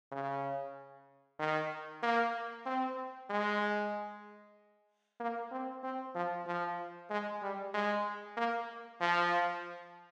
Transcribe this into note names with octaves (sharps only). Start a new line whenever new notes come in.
C#3
D#3
A#3
C4
G#3
A#3
C4
C4
F3
F3
G#3
G3
G#3
A#3
F3